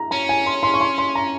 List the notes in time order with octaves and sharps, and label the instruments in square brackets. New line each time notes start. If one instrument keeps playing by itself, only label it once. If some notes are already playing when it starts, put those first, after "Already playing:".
Already playing: [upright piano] A#5
[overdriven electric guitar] C#4 [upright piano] A#5
[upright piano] G#5
C6
C6
C#6
C6
C6
A#5